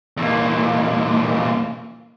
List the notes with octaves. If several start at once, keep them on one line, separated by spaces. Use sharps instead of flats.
E2 A#2